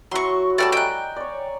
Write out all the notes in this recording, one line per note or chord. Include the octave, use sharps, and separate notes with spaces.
F#3 E4 F#4 C6 C#6
G3 A3 D5 F#5 A5
D#5 G5 G#5 A#5 F#6
C#5 D5